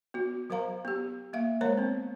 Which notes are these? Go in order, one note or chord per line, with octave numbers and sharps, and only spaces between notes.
B3 F#4
F#3 A#4 C5 F5 A#5
B3 G4
A#3 E5 F5
G#3 A#4 C5 C#5 A#5
B3 C4